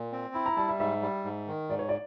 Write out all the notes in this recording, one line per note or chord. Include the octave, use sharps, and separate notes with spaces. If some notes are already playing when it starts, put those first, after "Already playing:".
Already playing: A#2
C4
E4 G5
A#5
G3 A5
E5
G#2 E5
G3
G#2
D#3
G#2 D5
C#5
D5